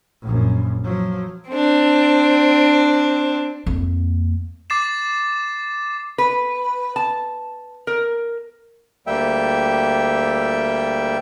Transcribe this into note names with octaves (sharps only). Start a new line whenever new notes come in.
A#1 F#2
F3 F#3
C4 D4
F2 A#3
D6 A6 C7 E7
B4
A5
A#4
D2 G3 A#3 E5 G5